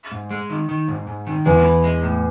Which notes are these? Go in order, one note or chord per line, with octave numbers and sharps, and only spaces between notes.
G#2
G#3
D#3
D#3
G#2
G#2
D#3
E2 G#3
E3
G#3
A2